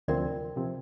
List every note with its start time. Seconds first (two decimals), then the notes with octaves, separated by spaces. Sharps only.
0.08 D2 C3 F3 C4 A#4 D5
0.56 C3 F3 C4